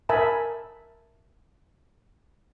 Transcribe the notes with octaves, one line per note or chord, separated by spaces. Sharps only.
A#4 E5 G#5 A5 B5